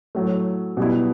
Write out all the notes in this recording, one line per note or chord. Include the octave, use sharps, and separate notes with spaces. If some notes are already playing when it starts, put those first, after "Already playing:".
A2 F#3 A3
B2 G3 B3 E4